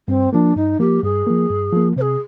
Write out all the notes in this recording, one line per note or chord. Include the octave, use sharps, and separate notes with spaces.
G2 C4
F3 A#3 D4
G2 D#4
F3 A#3 G4
G2 G#4
F3 A#3
G2
F3 A#3
C3 G#4 C5